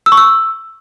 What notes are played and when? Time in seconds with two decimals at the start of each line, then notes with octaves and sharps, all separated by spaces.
0.06 E6
0.12 C#6
0.17 E6